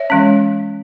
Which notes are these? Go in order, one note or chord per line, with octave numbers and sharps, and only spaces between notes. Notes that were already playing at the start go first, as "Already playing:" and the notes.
Already playing: C#5 E5
E3 G#3 C#4